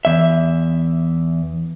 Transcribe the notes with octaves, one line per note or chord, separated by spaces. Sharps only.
E2 E5